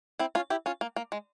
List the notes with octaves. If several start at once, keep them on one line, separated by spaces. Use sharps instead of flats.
C4 E4
C#4 F4
E4 G4
C#4 F4
A#3
A#3
G#3